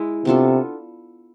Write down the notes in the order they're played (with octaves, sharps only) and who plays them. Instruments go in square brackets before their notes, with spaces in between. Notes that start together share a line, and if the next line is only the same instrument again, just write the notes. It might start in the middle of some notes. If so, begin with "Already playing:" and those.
Already playing: [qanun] G#3 E4
[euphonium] C3 [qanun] B3 D4 F4 A4